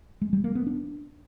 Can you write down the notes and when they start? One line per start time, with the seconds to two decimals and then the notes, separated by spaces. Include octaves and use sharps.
0.22 G#3
0.33 G3
0.44 A#3
0.55 B3
0.67 D4